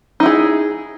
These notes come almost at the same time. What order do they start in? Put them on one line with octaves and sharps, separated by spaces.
D#4 E4 G#4